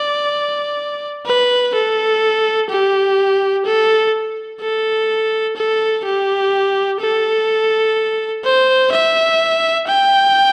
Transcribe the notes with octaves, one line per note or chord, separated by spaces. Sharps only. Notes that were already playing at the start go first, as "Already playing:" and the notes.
Already playing: D5
B4
A4
G4
A4
A4
A4
G4
A4
C5
E5
G5